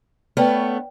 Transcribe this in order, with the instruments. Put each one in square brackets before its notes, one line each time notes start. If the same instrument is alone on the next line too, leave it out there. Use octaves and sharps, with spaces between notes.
[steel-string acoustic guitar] A3 B3 C#4 [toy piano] B4 D5 G5